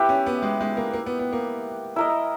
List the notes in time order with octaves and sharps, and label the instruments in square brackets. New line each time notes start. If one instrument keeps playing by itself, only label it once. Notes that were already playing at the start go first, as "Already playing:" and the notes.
Already playing: [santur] E4 G4 B4
[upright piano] C#4
B3
G#3
G#3
A#3
A#3
B3
B3
A#3
[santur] E4 A#4 D#5